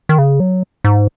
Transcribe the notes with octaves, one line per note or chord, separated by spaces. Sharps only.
D#3
C#3
F#3
G#2